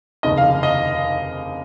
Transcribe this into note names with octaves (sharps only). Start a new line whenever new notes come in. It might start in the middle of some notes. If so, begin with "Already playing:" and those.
F1 D#2 C#3 D#5
F5
D#5